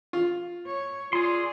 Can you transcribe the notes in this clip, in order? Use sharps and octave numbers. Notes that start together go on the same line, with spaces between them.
F4
C#5
F4 G#4 D5 C6